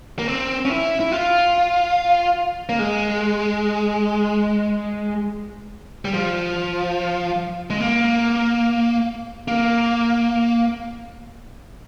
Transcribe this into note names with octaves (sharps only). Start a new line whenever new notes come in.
A#3
C4
C#4
E4
E4
F4
A#3
G#3
G3
F3
G#3
A#3
A#3